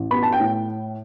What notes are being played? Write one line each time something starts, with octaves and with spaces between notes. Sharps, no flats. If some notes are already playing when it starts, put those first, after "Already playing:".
Already playing: A1
B3 B5
A5
G5
A2